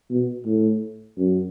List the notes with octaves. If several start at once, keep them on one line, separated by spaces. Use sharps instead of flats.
B2
A2
F#2